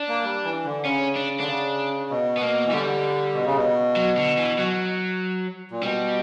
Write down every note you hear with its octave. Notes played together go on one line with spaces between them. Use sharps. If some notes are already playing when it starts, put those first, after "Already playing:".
Already playing: D4
A#3
G3
E3
D3
C#3 C#4
D4
D3 D4
C#3
B2
B3
B2 A#3
E3
D3 G3
B2
C#3
B2
F#3
D3
E3
F#3
A#2
B2 G3